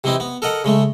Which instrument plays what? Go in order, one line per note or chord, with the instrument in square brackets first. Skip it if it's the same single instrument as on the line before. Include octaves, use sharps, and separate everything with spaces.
[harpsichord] C3 E3 C4 D#4 E4
B3
A4 A#4 D#5 F#5
C#3 G#3 A3